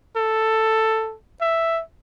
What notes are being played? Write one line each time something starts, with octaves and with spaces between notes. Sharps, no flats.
A4
E5